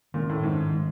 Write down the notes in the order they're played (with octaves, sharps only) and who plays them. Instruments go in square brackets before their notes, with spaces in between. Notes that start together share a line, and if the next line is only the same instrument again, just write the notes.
[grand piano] A#2 [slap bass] D#3 G#3 C#4
[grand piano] A2
[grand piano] G#2 [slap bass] D#3 G#3 C#4
[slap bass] D#3 G#3